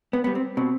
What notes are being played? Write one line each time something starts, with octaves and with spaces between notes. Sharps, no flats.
B3
G3 B3
C4
B2 C4